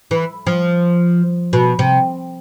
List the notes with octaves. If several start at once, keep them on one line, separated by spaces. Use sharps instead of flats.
E3
F3
B2
C3